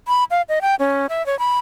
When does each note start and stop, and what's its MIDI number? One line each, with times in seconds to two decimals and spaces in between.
0.08 0.24 83
0.31 0.42 77
0.49 0.59 75
0.62 0.75 79
0.79 1.07 61
1.09 1.25 76
1.26 1.38 73
1.39 1.59 83